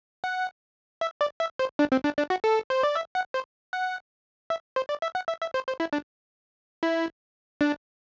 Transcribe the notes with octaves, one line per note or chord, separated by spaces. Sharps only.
F#5
E5
D5
E5
C5
D4
C4
D4
D4
F#4
A4
C5
D5
E5
F#5
C5
F#5
E5
C5
D5
E5
F#5
E5
E5
C5
C5
E4
D4
E4
D4